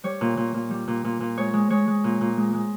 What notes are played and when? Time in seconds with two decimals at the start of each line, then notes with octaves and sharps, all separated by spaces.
0.04 G3 C#5
0.21 A#2
0.37 A#2
0.54 A#2
0.71 G3
0.88 A#2
1.04 A#2
1.20 A#2
1.37 G#3 C#5
1.53 G#3
1.70 G#3 C#5
1.87 G#3
2.04 A#2
2.21 A#2
2.37 G#3
2.53 G#3